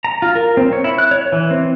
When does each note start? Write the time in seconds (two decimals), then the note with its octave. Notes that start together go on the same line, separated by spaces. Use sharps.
0.04 A#5
0.22 F4
0.35 A#4
0.57 C4
0.73 C#5
0.84 E4
0.98 F#6
1.11 C#5
1.32 E3
1.51 C4